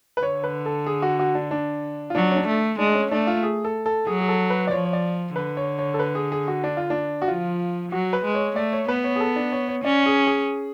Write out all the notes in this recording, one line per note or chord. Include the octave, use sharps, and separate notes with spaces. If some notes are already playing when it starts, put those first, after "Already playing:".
B4
D3 C#5
B4
A4
G#4
F#4
F#4
D4
D4
F4
F#3 D4
C#4
D4
A3
G#3 D4
C#4
A3 D4
F4
G#4
A4
A4
F#3 G#4
G#4
A4
B4
D5
F3 C#5
C#5
D5
D3 B4
C#5
C#5
A4
B4
G#4
G#4
F#4
D4
F4
D4
F#4
F3 F4
F#3 F#4
B4
G#3
C#5
A3 D5
C#5
B3 B4
C#5
G#4
A4
D4
C#5
C#5
C#4 D5
G#4
G#4